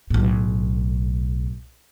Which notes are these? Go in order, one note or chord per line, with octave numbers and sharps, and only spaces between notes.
B1 A2